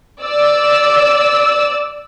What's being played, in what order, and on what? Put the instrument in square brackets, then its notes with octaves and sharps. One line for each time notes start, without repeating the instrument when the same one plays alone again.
[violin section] D5 E6